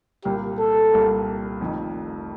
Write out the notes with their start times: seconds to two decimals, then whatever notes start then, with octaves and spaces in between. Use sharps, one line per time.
0.25 C2 A#2 G3 A#3 G4
0.59 A4
0.92 C2 A#2 G3 A#3
1.61 F1 F2 D#3